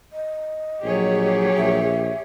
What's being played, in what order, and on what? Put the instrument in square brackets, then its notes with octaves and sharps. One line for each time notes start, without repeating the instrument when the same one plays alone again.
[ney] D#5
[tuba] A#1 [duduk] F#3 [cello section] G4 G#4 C#5
[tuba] A#1 [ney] E5